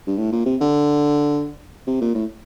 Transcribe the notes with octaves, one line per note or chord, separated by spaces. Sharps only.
G2
A2
A#2
C3
D3
C3
A#2
A2